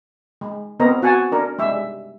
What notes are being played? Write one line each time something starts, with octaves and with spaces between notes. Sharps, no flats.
G#3
B3 C4 A#4 D#5 A#5
F#4 F#5 G#5 A5
D4 A#4
G3 G#3 E5